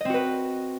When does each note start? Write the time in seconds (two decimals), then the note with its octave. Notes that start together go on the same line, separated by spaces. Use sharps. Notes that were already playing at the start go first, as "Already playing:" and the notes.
0.01 D#5
0.05 C4
0.10 F#4
0.14 B4